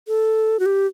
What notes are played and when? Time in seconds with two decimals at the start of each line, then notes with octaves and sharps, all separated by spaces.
0.08 A4
0.59 F#4
0.66 G4